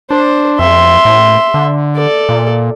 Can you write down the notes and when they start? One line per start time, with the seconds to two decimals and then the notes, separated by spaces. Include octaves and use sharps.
0.11 D4 C5
0.59 F2 E5 C6
1.05 A2
1.54 D3
1.96 A4 D5
2.29 A#2